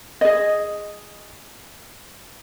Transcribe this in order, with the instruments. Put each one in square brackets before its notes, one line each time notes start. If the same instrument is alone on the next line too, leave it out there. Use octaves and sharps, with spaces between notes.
[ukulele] G#4 D#5